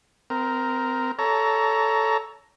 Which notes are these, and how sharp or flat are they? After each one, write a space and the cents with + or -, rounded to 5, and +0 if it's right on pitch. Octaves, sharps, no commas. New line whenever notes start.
C4 -25 A#4 +0
A4 +0 C#5 +20 A#5 +5